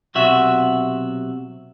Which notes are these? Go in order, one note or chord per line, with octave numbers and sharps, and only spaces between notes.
B1 C3 F#4 E5